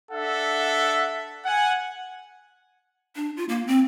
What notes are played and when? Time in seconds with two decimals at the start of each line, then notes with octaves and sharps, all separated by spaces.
0.11 D4 A4 E5 F#5
1.45 F#5 G#5
3.16 D4
3.37 F4
3.49 A#3
3.67 C4